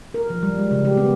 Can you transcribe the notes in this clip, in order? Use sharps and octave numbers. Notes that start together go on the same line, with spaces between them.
A#4
F3
G3
G#3
C#3
G4
B3